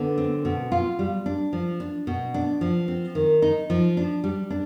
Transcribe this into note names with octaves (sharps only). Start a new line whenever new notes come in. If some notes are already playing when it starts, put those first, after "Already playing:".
Already playing: D3 B3
C4
B2
F4
G3
D4
F3
D4
B2
D4
F3
C4
D#3
D#4
F3
D4
G3
D4